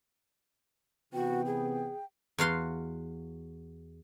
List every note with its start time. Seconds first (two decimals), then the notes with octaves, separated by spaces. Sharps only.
1.13 C3 E3 B3 F#4 G5
1.46 G#4
2.38 E2 F#4 F5 C6